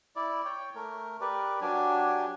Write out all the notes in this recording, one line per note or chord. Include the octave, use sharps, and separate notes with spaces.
E4 D5
C#5 G5
A3 A#4
G4 A#4 B4 D5
F#3 D4 G4 G#5